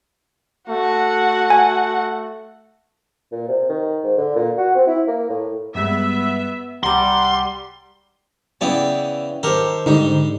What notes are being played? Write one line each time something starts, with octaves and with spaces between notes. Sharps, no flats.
A3 F#4 F#5
G#5
A#2
C3
D#3
G#2
D3
A#2
F#4
C4
E4
A#3
A2
G2 G3 G#3 B3 E5
C2 G3 F#5 A#5 C6 D6
C#3 E3 B3 D5 E5 G5
D#3 G4 A4 A#4 C5
G#2 D3 G3 D#4